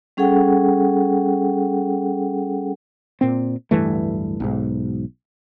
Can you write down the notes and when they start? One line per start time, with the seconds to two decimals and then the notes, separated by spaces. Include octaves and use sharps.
0.17 G3 C#4 G#4 A4 F#5 G5
3.21 A#2 C4
3.71 D1 G2 E3 A3
4.40 B1 G#2